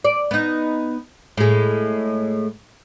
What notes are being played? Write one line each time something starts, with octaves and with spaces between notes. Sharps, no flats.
D5
B3 D#4
A2 G#3